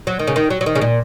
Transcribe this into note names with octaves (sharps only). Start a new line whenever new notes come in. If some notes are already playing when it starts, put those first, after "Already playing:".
F#3
D#3
C#3
D#3
F#3
F#3
D#3
C#3
A#2